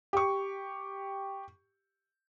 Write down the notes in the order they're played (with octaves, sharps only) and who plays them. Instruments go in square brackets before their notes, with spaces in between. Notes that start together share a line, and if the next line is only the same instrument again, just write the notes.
[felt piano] G4 C#6